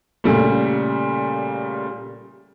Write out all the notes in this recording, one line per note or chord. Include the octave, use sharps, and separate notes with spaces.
A#2 C#3 G3 A3